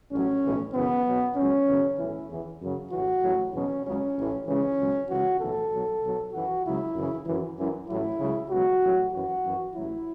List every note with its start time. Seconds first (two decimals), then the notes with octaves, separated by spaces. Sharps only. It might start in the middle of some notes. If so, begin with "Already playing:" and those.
0.12 A1 A2 F#3 C#4
0.43 B1 A2 E3
0.74 F#2 C#3 E3 B3
1.06 B1 B2 F#3
1.36 C#2 B2 F#3 C#4
1.67 E2 C#3 F#3
1.98 B1 A2 E3 E4
2.29 E2 E3
2.61 F#2 C#3 F#3
2.91 A1 A2 E3 F#4
3.22 A1 A2 F#3
3.53 E2 B2 F#3 C#4
3.85 C#2 C#3 F#3 C#4
4.16 A1 A2 E3
4.47 C#2 C#3 E3 C#4
4.78 C#2 B2 F#3
5.08 C#2 C#3 E3 F#4
5.40 B1 A2 E3 A4
5.71 B1 B2 F#3
6.02 B1 B2 F#3
6.32 F#2 E3 F#4
6.64 C#2 C#3 F#3 E4
6.95 F#2 C#3 E3
7.26 F#2 E3
7.57 F#2 E3
7.88 A1 A2 F#3 E4
8.19 C#2 C#3 F#3
8.50 C#2 B2 F#3 F#4
8.81 A1 A2 F#3
9.12 F#2 E3 F#4
9.44 F#2 E3
9.74 A1 A2 F#3 E4